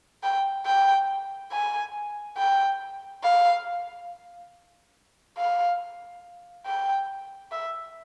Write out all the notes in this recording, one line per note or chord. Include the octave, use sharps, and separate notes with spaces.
G5
G5
G#5
G5
F5
F5
G5
E5